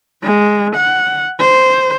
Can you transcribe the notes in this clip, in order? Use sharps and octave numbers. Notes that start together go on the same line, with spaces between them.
G#3
F#5
C5